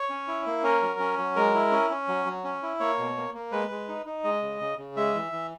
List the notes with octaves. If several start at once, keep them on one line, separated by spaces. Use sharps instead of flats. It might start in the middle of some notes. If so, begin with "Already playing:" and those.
Already playing: C#5
C#4
E4
A#3
C#4 A#4
F#3
C#4
F#3
G#3 A#4
E4
C#4
C#4
F#3
F#3
C#4
E4
A#3 C#5
B2
A#3
A#3
G#3 B4
G#3
D#4
D#4
G#3 D#5
C#3
C#3
C#3
G#3 E5
E3
E3